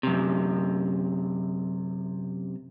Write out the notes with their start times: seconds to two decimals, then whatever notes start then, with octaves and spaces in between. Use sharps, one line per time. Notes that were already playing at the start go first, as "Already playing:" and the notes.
0.03 F#2 C3